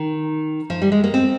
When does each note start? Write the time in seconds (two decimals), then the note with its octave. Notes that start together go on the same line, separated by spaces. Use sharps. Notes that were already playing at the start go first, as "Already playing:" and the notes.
Already playing: D#3
0.70 F3
0.82 G3
0.92 G#3
1.04 A#3
1.14 C4